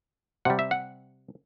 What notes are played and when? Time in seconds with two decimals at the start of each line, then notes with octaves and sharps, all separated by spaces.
0.45 C3 G3 F#5
0.59 E5
0.71 F#5